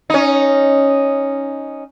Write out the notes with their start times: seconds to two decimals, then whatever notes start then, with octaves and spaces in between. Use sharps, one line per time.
0.10 C#4 D#4